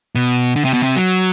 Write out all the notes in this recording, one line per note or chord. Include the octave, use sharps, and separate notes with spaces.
B2
D3
C3
B2
C3
F#3